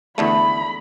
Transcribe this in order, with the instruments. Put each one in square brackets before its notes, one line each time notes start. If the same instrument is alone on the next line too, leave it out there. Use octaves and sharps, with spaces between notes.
[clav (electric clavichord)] E2 D3 A3 [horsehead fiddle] B5